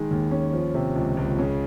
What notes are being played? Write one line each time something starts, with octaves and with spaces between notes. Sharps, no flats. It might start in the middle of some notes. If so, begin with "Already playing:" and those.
Already playing: D#3 G#3
D#2
C#4
F3
C3
C#2
C#2
C#3